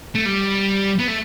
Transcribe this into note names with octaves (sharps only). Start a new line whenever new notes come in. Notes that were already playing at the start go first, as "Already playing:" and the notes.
A3
G3
B3
A3